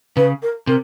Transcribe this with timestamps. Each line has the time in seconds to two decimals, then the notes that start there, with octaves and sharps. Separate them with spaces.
0.16 C#3 B4
0.42 A#4
0.67 C3 A#4